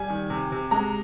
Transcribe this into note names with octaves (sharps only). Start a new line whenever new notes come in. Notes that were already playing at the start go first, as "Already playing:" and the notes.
Already playing: G3 G#5
D#3
C3
C3
G#3 A#5